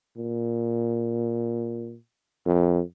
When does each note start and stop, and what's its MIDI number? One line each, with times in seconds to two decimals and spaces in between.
0.17 1.96 46
2.46 2.82 41